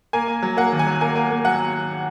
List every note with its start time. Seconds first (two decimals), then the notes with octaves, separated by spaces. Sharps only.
0.13 A#3 G#5
0.28 A#3
0.42 F#3
0.57 A#3 F#5
0.72 D#2
0.79 G#5
0.87 F#3
1.01 A#3 G#5
1.15 A#3
1.30 A#3
1.45 F#3 F#5